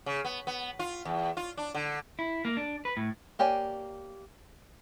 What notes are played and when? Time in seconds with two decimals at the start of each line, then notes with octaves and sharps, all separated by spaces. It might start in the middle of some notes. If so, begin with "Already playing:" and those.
0.06 C#3
0.25 B3
0.47 B3
0.79 F4
1.05 E2
1.37 F4
1.57 D4
1.75 D3
2.19 E4
2.45 A#3
2.57 D4
2.85 B4
2.97 A2
3.39 A#3 G4 C#5 D5 G#5